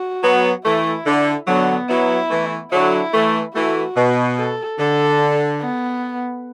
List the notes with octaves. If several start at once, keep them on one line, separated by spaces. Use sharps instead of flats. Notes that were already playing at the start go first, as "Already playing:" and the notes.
Already playing: F#4
F#3 B3
E3 A3 E4
D3
D3 F#3 B3
F#3 B3 E4
E3 A3
D3 F#3 E4
E3 A3
E3 A3 F#4
B2
A4
D3 A4
B3